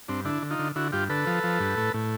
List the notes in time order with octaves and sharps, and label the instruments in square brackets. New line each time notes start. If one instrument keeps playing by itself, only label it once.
[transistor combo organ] G2 C4 D4
D3 D4 E4
D3
D#4 F4
D3
D3 E4 F#4
G2 F4 G4
D3 A4 B4
F3
F3
G2
A2
A2